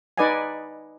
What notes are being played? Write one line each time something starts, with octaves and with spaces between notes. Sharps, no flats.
D#4 B4 D5 D#5 F#5 G#5